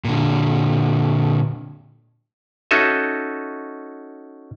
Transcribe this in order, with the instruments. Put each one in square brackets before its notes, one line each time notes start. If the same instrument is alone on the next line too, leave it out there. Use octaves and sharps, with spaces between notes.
[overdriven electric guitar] A#2 D3
[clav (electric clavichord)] C#4 D#4 F#4 A4 D#5 E5